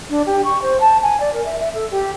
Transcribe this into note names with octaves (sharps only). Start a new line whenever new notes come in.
D4
G4
C#6
C5
A5
G#5
D5
A#4
E5
E5
A4
G4